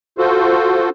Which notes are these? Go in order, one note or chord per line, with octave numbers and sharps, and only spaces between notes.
F4 F#4 A4 C5